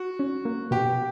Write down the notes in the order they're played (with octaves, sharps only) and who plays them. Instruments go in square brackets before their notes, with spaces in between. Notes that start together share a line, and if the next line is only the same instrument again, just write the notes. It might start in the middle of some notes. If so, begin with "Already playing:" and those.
Already playing: [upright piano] F#4
[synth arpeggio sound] C#4
A#3
[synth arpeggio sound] B2 [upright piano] G4